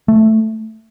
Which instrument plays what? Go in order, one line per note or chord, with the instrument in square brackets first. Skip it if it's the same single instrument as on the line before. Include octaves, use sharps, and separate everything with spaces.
[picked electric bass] A3